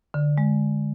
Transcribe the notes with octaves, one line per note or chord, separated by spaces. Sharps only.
D3
G#3